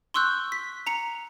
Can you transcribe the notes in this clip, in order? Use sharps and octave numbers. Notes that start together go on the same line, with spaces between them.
C6 C#6 E6 F#6 G6
B6
A#5 C#7 F7